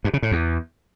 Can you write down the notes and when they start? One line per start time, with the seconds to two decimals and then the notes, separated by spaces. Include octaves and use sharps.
0.04 G2
0.13 C#3
0.23 A2
0.32 E2